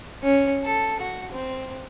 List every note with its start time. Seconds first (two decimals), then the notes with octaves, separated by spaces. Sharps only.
0.23 C#4
0.64 A4
1.00 F#4
1.32 C4